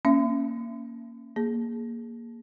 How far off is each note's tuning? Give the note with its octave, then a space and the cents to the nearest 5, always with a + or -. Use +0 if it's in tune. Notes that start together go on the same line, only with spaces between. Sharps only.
A#3 +0 C#4 -5 E5 +30
A#3 +0 G#4 +0